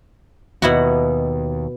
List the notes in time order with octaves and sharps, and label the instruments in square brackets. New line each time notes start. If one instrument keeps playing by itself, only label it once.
[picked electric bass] D#2 [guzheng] B2 E4 F#4